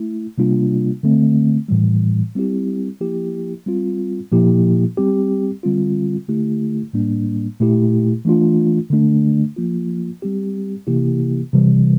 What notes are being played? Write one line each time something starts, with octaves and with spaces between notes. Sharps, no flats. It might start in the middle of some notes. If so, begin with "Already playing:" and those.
Already playing: A3 E4
C3 G3 A#3 D4 F4
D3 A3 C4
A2 E3 G3
G3 C4 E4 G4
F3 A#3 E4 G4
G3 C4 F4
A#2 F3 A#3 E4 G4
G3 C4 G4
D3 G3 C4 F4
D3 A3 E4 G4
A2 G3 A#3 D4
A#2 A3 E4 G4
E3 A3 D4 F4
D3 A3 D4
F3 A#3 F4
G3 C4 G4
C3 E3 A#3 E4 G4
C3 E3 G3